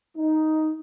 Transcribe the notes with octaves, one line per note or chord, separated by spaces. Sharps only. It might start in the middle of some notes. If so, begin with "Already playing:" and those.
D#4